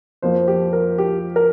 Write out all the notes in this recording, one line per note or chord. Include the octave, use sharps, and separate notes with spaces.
F2 F3 A#3 F4 C5
G4
A#4
G4
A#4